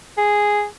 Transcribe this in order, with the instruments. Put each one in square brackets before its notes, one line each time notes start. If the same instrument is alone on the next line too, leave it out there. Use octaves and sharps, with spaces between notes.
[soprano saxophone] G#4